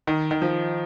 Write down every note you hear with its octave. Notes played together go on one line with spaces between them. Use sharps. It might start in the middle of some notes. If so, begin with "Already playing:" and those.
D#3
D#3
F3